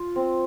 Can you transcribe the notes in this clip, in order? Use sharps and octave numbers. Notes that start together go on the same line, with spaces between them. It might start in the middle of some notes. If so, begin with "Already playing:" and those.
Already playing: F4
C4